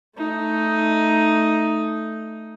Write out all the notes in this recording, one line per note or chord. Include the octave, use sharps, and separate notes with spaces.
A3 D#4